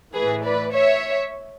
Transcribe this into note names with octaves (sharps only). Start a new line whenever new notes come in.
A2 E3 G#4 B4
B4 D5
C#5 E5